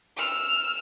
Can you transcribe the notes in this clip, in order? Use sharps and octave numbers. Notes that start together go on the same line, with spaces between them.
E6 F6